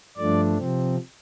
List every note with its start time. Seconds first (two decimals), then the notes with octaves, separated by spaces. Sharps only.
0.17 G2 F3 A3 D4 D5
0.57 C3 F3 C4